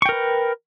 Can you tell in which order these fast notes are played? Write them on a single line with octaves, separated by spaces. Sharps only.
C#6 G5 A#4 B4